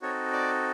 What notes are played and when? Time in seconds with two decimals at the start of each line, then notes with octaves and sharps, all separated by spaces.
0.02 C4 D#4 F#4 A4 C#5
0.33 D5